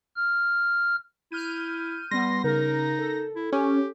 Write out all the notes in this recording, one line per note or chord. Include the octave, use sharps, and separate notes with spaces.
F6
E4 F6 G6 D#7
G3 B3 C6 A#6
C#3 D#4 A#4
A4
E4
C#4 G4